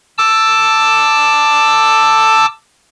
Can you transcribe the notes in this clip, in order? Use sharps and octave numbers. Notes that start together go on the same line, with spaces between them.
A5 D6 E6